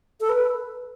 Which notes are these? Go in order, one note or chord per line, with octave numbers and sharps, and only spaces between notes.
A4
B4